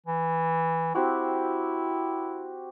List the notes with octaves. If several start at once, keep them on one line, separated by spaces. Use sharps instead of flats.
E3
C4 E4 F#4 G4